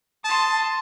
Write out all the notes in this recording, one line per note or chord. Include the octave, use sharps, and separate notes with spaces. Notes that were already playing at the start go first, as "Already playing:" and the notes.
A5 C6 D#6